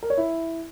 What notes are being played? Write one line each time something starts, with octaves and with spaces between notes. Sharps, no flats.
A#4
C#5
E4